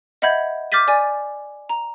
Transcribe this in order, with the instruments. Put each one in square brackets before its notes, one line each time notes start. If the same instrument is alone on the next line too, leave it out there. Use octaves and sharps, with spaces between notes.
[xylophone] D#5 E5 F#5 B5 G6 G#6
D6 F6 G6 A6 B6 D#7
D5 G#5 A6 D#7
A#5